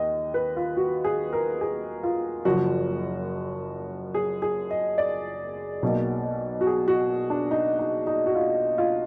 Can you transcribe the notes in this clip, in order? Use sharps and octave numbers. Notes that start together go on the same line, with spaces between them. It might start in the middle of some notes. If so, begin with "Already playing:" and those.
Already playing: D#2 D#5
B4
F4
F#4
G#4
A#4
G#4
F4
F#1 F#2 F3 F#4
G#4
G#4
D#5
D5
B1 B2 A#3
F#4
G#4
F#4
D4
D#4
D#4
D#4
F#4
F4
F4